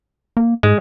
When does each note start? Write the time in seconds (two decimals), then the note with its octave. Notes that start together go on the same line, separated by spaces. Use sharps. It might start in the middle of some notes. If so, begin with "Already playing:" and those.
0.37 A#3
0.63 G#2 G#3